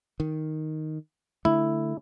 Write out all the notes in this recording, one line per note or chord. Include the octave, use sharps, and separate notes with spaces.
D#3
D3 A3 E4